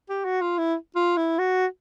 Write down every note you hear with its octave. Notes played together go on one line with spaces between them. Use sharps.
G4
F#4
F4
E4
F4
E4
F#4